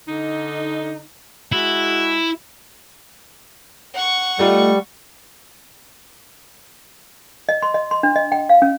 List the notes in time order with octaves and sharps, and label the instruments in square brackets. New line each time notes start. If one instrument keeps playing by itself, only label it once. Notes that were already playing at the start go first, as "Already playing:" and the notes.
[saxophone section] D3 D#4
[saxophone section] G#3 F#4 [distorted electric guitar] E4
[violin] F#5 C#6
[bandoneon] G3 [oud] A3 D#4 F4
[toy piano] D#5
C6
D#5
C6
D4
D#5
G5
F5
C#4